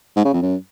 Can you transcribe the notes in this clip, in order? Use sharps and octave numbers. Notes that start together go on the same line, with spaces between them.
G#2
C#3
F2
F#2